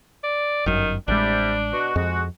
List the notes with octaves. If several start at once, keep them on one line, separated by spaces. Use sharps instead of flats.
D5
G1 F#2 D#3
A1 C3 G3 G#3 D4
B2 F#4
F2 G#3 F#4